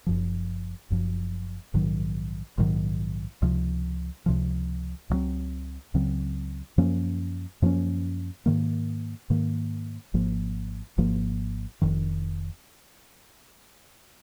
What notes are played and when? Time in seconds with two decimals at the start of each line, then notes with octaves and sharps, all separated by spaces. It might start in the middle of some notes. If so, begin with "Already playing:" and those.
0.06 F#1 F#2 F3
0.90 F#1 F#2 F3
1.74 A#1 G#2 D#3 F#3
2.58 A#1 G#2 D#3 F#3
3.42 C#2 C3 F3
4.26 C#2 C3 F3
5.10 C#2 C#3 F#3 C4
5.94 C#2 C#3 F#3 C4
6.78 F#2 F3 A#3 C#4
7.62 F#2 F3 A#3 C#4
8.46 G#2 D#3 A#3
9.30 G#2 D#3 A#3
10.14 G#1 G#2 F3 A#3
10.98 G#1 G#2 F3 A#3
11.82 F1 F2 D#3